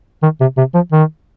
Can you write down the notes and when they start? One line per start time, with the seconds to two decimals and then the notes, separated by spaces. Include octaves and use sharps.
0.23 D#3
0.41 C3
0.57 C3
0.74 F3
0.92 D#3